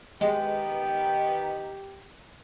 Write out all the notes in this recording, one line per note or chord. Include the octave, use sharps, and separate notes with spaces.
D#3 G#3 B3 D#4 G4 G5